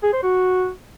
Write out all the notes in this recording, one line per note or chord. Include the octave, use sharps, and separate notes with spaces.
G#4
C5
F#4